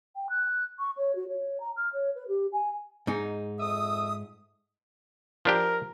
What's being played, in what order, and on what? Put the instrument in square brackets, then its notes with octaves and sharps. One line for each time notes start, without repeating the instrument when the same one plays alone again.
[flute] G5
F#6
C#6
C#5
F#4
C#5
A#5
F6
C#5
B4
G4
G#5
[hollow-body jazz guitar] G#2 D#4
[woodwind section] F2 E5 D#6
[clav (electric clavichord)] F3 D4 G4 [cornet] A#4